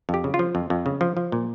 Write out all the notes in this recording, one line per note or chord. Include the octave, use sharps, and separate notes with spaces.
F2
G4
C#3
F4
F3
F2
F2
C#3
F3
F3
A#2